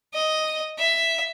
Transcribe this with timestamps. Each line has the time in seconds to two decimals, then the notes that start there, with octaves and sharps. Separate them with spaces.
0.14 D#5
0.79 E5